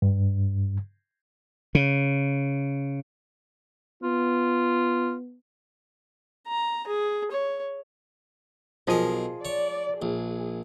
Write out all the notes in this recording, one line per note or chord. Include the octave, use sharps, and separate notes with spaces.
G2
C#3
B3 F4
A#5
G#4
C#5
B1 F3 G#4 A#4 D#5
C#5 D5
A#1 G#4